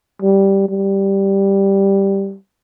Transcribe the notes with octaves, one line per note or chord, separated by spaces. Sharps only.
G3
G3